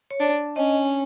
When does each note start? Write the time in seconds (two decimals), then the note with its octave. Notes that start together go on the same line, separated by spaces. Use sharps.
0.11 C#5
0.20 D4 D5
0.56 C#4 D#5